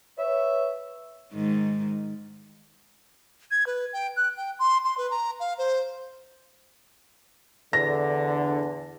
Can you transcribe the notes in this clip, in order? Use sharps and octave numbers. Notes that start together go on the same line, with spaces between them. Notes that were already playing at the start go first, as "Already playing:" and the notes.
B4 C#5 E5
G#2 D#3
G#6
B4
G5
F#6
G5
C6
C6
B4
A#5
F5
C5
E2 D3 A#6